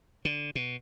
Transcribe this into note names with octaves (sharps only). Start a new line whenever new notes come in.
D3
B2